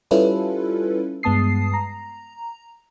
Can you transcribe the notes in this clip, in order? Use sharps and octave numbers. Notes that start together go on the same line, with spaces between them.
G3 C#4 E4 F4 A4 B4
G2 G#3 B3 A5 D#6 C7
A#5